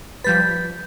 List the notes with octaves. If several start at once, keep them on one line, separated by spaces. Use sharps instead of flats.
F3 G3 B4 G6 A6 B6